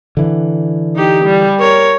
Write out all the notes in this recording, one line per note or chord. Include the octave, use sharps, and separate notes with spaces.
D3 E3
D#4 G4
G3
A#4 C#5